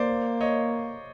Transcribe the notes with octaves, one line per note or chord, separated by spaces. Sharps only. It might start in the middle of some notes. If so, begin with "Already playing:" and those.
Already playing: A#3 C5 D5
C#5 D#5